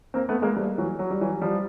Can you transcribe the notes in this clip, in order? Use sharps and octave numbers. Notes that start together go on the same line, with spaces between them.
A#3 C4
A3 B3
G#3 A#3
G3 A3
E3 F#3
F#3
G3
E3 F#3
F3 G3